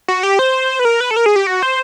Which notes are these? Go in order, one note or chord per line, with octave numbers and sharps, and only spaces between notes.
F#4
G4
C5
B4
A#4
B4
A4
A#4
G#4
G4
F#4
C5